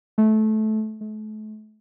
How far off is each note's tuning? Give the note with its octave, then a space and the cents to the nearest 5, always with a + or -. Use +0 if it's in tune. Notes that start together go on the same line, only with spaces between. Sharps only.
A3 -20
A3 -40